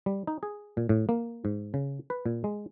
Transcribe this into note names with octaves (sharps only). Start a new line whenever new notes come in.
G3
D#4
G#4
A#2
A2
A#3
G#2
C#3
B4
A#2
G#3